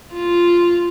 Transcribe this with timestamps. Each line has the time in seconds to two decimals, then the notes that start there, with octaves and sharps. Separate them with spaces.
0.13 F4